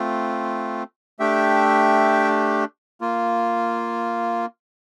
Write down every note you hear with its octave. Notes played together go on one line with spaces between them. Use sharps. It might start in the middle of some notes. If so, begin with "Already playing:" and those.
Already playing: A3 C4 F4
A3 D4 G4 E5 G5
A#3 F4